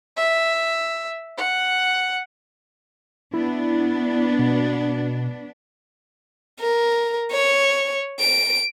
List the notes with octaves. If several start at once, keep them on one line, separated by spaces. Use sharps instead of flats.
E5
F#5
B3 D4 E4
B2
A#4
C#5
D7